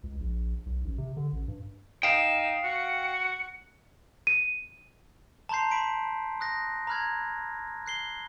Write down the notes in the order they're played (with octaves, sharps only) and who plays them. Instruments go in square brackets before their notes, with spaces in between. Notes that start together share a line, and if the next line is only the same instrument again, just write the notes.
[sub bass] C#2
A#1
B1
A1
C3
D3
A1
G2
[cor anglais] D#4 [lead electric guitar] F5 G5 [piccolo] E7
[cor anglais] F#4 [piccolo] C#7
[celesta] D#7
[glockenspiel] A5 A#5 C6 G6 C7
A5 B5 B6 D7
D#6 F#6 A#6
A#5 B5 F6 F#6 G#6
F#6 C7 G7